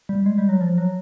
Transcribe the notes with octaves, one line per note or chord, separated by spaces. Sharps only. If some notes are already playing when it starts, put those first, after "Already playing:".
G3
G#3
G3
F#3
F3
F#3